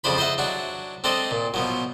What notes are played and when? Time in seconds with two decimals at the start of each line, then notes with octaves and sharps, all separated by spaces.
0.04 F2 C#3 F3 D4 C5 B5
0.18 C5 D#5 E5 F#5
0.38 F#3 D4 F#4
1.04 C4 D4 A4 C5 D#5
1.31 A#2
1.54 B2 F3 F#3